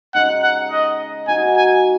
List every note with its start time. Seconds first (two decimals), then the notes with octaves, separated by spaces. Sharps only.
0.14 C#3 G#3 D#4 F#5
0.43 F#5
0.71 D#5
1.28 G#3 D#4 F#4 G#5
1.56 G#5